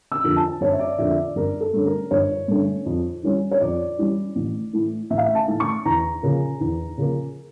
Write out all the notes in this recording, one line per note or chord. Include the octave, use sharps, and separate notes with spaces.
E6
F2 D3 F3 A#3
A5
G1 C#5
E5
D5
F2 D3 F3 A#3 E5
D5
G1 A#4
A4
G2 D3 A3 C#4
A#4
G1 C#5
G2 D3 A3 C#4
F2
E3 G3 C#4
C#5
F2 D5
E3 G3 C#4
A1
A2 E3
A1 E5
F5
E5
A5
A2 E3
C#6
E2 A#5
C#3 F3 A#3
E2
C#3 F3 A#3